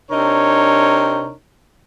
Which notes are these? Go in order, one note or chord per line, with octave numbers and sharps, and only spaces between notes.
C3 D4 D#4 A#4 C#5